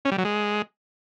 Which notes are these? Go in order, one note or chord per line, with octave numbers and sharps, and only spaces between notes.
C#4
G3
F#3
G#3